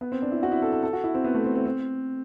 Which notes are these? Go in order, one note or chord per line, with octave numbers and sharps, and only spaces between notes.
B3
C4
D4
E4
F#4
E4
A4
A4
A4
F#4
E4
C4
B3
A3
C4
C4
C4